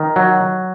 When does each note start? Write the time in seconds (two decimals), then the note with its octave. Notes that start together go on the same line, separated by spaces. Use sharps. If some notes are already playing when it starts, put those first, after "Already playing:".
Already playing: D#3
0.16 F#3